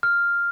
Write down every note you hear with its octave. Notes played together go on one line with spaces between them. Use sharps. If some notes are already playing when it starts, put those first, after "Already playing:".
F6